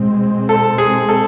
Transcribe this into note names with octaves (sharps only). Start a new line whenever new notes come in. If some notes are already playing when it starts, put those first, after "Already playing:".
Already playing: B2 G#3 C4
A4
G#4
A4